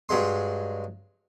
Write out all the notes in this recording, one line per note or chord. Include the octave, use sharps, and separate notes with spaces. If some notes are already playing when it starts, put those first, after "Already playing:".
G2 F#3 G#3 C6